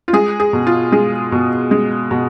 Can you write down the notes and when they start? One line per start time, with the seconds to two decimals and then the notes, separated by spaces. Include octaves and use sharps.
0.08 F4
0.13 G#3 G#4
0.40 G#4
0.53 B2
0.67 F4
0.92 G#3 G#4
1.32 B2
1.71 G#3
2.11 B2